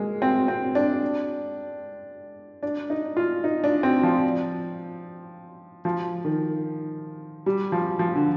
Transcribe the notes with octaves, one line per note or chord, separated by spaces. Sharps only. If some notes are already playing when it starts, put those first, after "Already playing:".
Already playing: G#3 A#3
C4
C4
D4
D4
D#4
F4
D#4
D4
C4
F3
F3
D#3
G3
F3
F3
D3